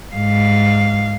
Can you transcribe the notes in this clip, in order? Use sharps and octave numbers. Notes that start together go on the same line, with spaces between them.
G#2 F5